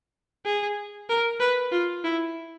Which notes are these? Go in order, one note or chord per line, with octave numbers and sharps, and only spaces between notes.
G#4
A#4
B4
F4
E4